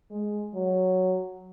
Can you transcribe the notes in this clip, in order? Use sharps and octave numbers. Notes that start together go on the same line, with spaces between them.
G#3
F#3